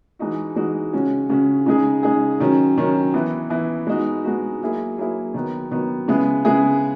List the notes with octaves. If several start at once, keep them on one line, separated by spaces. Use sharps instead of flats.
E3 G#3 D#4 F#4
E3 G#3 D#4 F#4
C#3 G#3 C#4 F#4
C#3 G#3 C#4 F#4
C#3 G#3 D#4 G#4
C#3 G#3 D#4 G#4
D#3 F#3 C#4
D#3 F#3 C#4
E3 B3 E4
E3 B3 E4
G#3 B3 D#4 F#4
G#3 B3 D#4 F#4
F#3 A#3 E4 G#4
F#3 A#3 E4 G#4
D#3 F#3 B3
D#3 F#3 B3
C#3 G#3 B3 E4 G#4
C#3 G#3 B3 E4 G#4